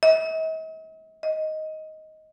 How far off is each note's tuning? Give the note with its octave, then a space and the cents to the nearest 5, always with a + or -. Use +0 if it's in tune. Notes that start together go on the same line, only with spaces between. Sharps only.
D#5 +45
D#5 +10